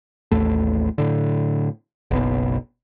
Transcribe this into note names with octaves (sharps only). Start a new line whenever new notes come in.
A1 D#2 A3
A2 D3
F#1 B1 B2